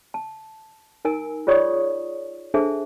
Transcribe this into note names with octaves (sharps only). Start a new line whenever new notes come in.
A5
D#4 A#4 G#5 E6
F4 G#4 C#5 D5 C#6 D#6
D4 G#4 A4 C5 E5 A5